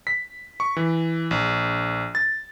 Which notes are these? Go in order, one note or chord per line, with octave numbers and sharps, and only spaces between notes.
B6
C#6
E3
A#1
A6